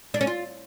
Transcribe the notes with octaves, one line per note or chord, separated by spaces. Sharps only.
D4
C#4
F4